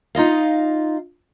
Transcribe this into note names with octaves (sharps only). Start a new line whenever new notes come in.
D#4 F4 D#5 F5